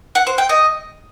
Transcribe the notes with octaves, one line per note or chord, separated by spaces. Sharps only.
F#5
C5
G5
D#5